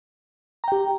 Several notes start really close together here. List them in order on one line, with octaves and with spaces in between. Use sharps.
A#5 G5 G4